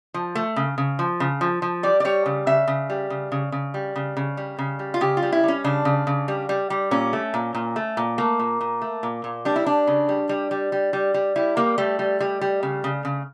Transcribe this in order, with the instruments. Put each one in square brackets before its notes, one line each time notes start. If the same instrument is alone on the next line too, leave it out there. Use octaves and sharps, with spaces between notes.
[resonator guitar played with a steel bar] F3
A3
C#3
C#3
F3
C#3
F3
F3
G3 D5
D5
G3 C#5
C#3
C#3 E5
C#3
G3
C#3
C#3
C#3
G3
C#3
C#3
G3
C#3
G3
F4
C#3 G4
F4
G3
E4
G3 C#4
C#3 D4
C#3
C#3
G3
G3
G3
A#2 C#4
A3
A#2
A#2
A3
A#2
A3 A#3
A#2
A#2
A3
A#2
A#2
G3 D4
E4
G3 D4
C#3
G3
G3
G3
G3
G3
G3
G3 E4
G3 A#3
G3 A3
G3
G3
G3
C#3
C#3
C#3